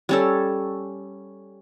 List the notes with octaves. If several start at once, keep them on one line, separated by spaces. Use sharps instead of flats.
G3 C#4 A4